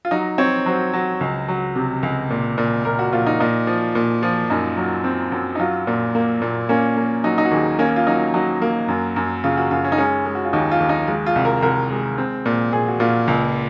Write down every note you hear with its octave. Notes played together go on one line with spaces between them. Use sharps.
F4
F#3 D#4
C4 C#5
F#3 C5
F#3
C#2
F#3
C3
C#2
A#2
A#2
A#2 A#4
F#4
A#2 F4
D#4
A#2 D#4
F3
A#2
F3
F#2 D#4
F#3
C4
F#2
D#4
F#3 F4
A#2
A#3
A#2
A#3 C#4
A#3
F#3 D#4
D#4
F#4
D#2 G#4
A#3 C#4
F4
F#3 D#4
F#3 D#4
A#3
F#2
F#2
C#3 F4
F#4
F#2 F4
C#4
D#4
G#3 C#4
G#3
F#4
F4
D#2 D#4
F4
D#2
D#4
G#3 F4
F4
C2
A#4
C2 A#4
G#3
C4
A#2
A#2 G#4
F#4
A#2 F4
C#2